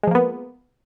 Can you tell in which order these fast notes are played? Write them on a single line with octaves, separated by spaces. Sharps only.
G#3 F3 A#3 B3